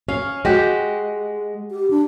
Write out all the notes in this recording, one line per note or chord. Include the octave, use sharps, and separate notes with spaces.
C#4 F5
G#3 F#4 G4
G4
D4